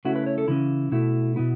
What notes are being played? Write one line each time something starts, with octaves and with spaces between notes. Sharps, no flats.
C#3 A3 C#4 E4 F#4
B4
C#5
A4
C#3 E3 C#4 E4
B2 A3 E4
B2 B3 E4